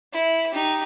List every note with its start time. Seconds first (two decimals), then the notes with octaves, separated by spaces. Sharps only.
0.13 E4
0.52 D#4 G4